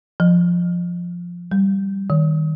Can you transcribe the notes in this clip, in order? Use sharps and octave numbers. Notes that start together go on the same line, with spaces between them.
F3
G3
D#3